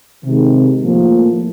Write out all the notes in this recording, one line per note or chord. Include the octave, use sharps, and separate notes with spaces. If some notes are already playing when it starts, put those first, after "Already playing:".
C3 D#3 G#3
A2 F3 A#3